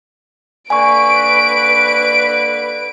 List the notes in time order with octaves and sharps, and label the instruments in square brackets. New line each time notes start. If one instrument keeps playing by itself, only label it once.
[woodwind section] D3 A#3 B4 [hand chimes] G#5 C#6 [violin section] D7